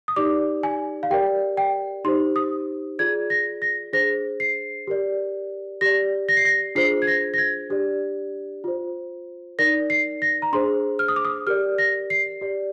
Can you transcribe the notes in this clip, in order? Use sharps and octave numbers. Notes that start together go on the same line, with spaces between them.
D#6
D#4 G4 D5 D6
G#5
F5
G4 A#4 D5 G5
G5
D#4 G4 C5 C6
D#6
F4 G#4 D5 G#6
A#6
A#6
D4 G#4 C5 A#6
C7
G4 A#4 D5
G4 D5 A#6
A#6
C7
A#6
D4 F4 G#4 C5 C7
G#6
A#6
A#6
G#6
D4 G4 D5
F4 C5
D#4 A#4 D5 A#6
C7
A#6
A#5
D4 G#4 C5 C6
F6
D#6
D6
D#6
G4 A#4 D5 F6
A#6
C7
G4 D5